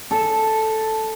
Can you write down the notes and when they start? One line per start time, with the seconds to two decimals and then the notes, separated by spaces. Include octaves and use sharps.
0.11 A4